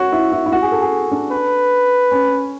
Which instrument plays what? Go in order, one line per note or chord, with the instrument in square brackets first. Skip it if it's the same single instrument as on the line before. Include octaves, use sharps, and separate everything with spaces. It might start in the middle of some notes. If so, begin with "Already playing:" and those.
Already playing: [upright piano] F#4 C#5
E4
E4
E4
F#4
G#4
A4
G#4
D4
[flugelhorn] B4
[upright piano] C#4